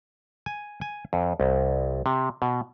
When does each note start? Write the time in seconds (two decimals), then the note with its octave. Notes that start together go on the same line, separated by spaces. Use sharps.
0.46 G#5
0.81 G#5
1.13 F2
1.40 C2
2.06 C3
2.42 B2